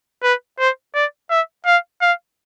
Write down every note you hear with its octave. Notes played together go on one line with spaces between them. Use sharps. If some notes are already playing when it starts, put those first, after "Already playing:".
B4
C5
D5
E5
F5
F5